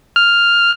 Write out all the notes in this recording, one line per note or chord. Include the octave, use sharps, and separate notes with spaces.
F6